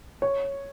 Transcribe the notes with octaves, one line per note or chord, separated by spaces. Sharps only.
C#5